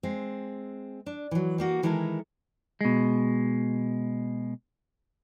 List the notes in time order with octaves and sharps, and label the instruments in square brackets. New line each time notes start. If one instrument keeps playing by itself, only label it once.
[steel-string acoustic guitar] G#3 C4
D4
E3 F#3
G3 A#3 F#4
D#3 E3 G#3 E4 A4 A#4
[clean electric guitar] B2 G#3